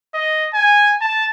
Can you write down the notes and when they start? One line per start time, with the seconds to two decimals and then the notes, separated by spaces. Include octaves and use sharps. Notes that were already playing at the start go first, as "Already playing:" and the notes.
0.14 D#5
0.54 G#5
1.01 A5